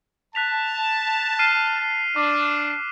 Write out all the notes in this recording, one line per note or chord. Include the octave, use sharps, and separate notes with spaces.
A5 F#6 B6 F7
F6 C7 D#7
D4 D6